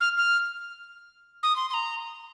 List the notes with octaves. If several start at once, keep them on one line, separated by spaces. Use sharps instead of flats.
F6
F6
D#6
C6
C6
A#5